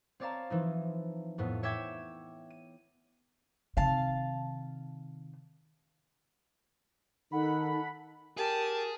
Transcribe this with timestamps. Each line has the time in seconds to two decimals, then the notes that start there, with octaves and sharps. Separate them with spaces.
0.20 C4 C#5 D5 F5 A5 A#5
0.50 E3 F3 D#4
1.38 F2 A2 B3
1.63 C#5 E5 G5 D6 G#6
2.50 D#7
3.77 C3 D#3 F5 A5
7.32 D#3 D#4 A4 F#5 B5
8.37 G4 G#4 A#4 A5